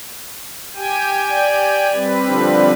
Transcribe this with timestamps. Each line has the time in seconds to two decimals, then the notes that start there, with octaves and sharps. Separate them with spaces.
0.75 G4 G5 G#5
1.30 D5
1.94 G3 C4 B4
2.27 D3 F3 D4